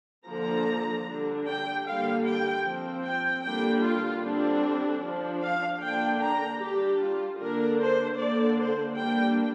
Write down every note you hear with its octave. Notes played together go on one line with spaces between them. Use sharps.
D3 F3 A#3 D4 A#5
D3 G3 D4
G5
D3 G3 A#3 F5
G5
F3 C4
G5
D3 G3 A#3 D4 G5
F4
D3 G3 C4 D4
F3 D4
F5
D3 A#3 D4 G5
A#5
G3 D4 G4
F4
D3 A#3 D4 A#4
C5
D3 A#3 D4 D5
C5
G3 A#3 D4 G5